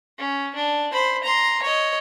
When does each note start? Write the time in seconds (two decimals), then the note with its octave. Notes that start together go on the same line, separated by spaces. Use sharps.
0.18 C#4
0.55 D4
0.92 C5 B5
1.24 A#5 C6
1.63 C#5 D#5